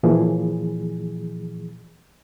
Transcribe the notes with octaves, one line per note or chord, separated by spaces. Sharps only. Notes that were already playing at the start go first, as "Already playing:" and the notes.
A#2 E3 F3 G#4